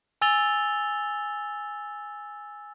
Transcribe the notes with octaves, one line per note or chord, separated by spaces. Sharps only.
G#5 E6 A6 F7 G7